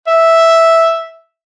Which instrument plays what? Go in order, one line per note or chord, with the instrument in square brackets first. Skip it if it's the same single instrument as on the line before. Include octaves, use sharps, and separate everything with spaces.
[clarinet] E5